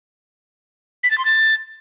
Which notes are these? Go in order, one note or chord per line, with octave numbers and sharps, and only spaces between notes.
B6
A6
C6
A6